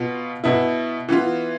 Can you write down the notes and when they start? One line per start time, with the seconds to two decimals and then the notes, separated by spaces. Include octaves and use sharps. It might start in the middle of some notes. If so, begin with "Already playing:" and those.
Already playing: B2 B3 F4
0.44 B2 B3 E4
1.09 E3 B3 F4